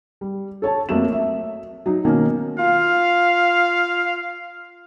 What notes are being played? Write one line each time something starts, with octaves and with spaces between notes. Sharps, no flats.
G3
A4 C#5 A5
F2 F#3 A3 A#3 F#4 E7
E5
F#3 D#4
B2 D#3 A#3 C#4
F4 F5